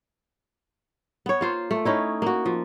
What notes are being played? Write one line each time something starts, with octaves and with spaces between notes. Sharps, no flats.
B3 C#5
A#3 F4 C5
A3
C#4 D#4 E4
A#3 F#4
F3